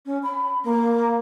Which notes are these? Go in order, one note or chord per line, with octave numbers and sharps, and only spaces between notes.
C#4
B5
A#3